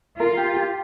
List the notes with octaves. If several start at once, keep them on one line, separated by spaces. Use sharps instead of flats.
F4 A#4
G4
G4